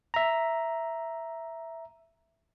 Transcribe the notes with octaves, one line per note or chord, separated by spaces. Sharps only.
E5 A#5